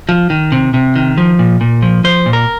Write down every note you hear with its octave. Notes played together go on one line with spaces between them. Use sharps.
F3
D#3
C3
C3
D#3
F3
A#2
A#2
F3
F3 C5
A#2
A#4